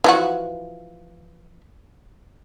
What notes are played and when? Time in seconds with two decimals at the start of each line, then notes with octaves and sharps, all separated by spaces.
0.04 E3 F3 F#4